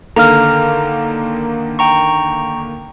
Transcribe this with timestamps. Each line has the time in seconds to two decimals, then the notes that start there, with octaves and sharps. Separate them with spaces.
0.16 D3 D#3 A#3 A4 F5 A#5 F6
1.79 G5 A#5 C#6